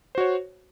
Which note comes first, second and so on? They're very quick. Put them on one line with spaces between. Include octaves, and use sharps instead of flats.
C5 F#4 C#5